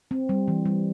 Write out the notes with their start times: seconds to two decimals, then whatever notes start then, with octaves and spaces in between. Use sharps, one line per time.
0.11 C4
0.29 G3
0.48 E3
0.66 G3